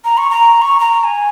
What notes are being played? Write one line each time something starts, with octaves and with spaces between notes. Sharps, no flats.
A#5
C#6
A#5
C#6
A#5
A#5
G#5